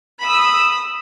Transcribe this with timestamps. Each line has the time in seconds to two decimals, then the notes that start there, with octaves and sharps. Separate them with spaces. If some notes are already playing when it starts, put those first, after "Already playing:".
0.23 B5 D#6 E6